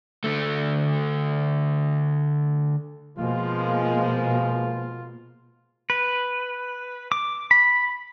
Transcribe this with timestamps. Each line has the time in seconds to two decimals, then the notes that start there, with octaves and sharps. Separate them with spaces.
0.24 D3 A3
3.18 B2 F3 G#3 A#3 F4
5.90 B4
7.12 D6
7.51 B5